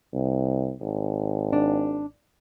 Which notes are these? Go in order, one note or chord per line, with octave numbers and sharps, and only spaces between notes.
C2
G#1
D4